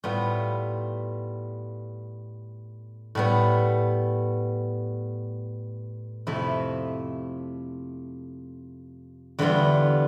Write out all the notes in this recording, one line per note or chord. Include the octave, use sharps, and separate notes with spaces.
A2 G3 B3 F4
A2 G3 B3
F2 C3 F3 A3 E4
E2 D3 G3 B3 F4